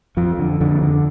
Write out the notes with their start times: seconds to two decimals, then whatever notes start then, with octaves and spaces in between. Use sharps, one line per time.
0.17 F2 F3
0.39 D3
0.60 F2 D3
0.82 D3